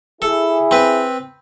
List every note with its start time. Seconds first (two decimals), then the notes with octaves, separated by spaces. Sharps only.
0.22 E4 G#4 A4
0.71 C4 B4